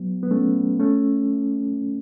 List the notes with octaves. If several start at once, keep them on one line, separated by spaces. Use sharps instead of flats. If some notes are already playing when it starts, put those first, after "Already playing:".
Already playing: F#3 B3
B3
A3 C#4
A3 C#4